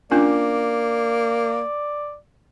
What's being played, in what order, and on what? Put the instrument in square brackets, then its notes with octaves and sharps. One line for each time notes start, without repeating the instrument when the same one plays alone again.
[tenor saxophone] A#3 [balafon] C#4 D4 F4 [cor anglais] D5